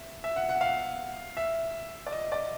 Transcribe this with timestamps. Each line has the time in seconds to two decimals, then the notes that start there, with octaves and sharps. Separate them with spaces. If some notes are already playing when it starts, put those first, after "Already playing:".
Already playing: E5
0.24 E5
0.36 F#5
0.49 F#5
0.61 F5
1.37 E5
2.07 D5
2.12 D#5
2.32 D5